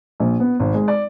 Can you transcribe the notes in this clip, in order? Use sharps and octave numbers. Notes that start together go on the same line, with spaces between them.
A#1
B3
G#1
G#3
D5